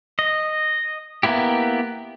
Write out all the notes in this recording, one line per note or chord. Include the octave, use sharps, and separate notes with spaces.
D#5
A#3 B3 E4 G4